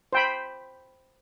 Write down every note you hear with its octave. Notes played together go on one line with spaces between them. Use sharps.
C5 G5 B5